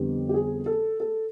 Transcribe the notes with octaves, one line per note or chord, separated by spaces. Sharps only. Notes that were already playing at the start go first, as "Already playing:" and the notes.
Already playing: F2 D3 G3 B3 D4 G4
G4
G#4
A4
A4